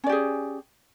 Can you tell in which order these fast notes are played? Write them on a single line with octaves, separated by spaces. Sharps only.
C#4 D5 G4 G#4